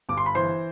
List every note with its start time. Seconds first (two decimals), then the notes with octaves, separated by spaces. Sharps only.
0.09 G1 D6
0.18 C6
0.26 B5
0.35 E3 C5 C6